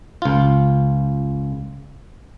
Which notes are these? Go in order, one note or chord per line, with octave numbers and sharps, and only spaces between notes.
C#2 F4